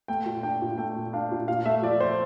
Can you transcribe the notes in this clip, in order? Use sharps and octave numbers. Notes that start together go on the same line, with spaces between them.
A3 G5
A#2
D4 G5
A#2
A3 G5
A#2
D4 F5
A#2
A#2 F5
A3 E5
F3 D5
C5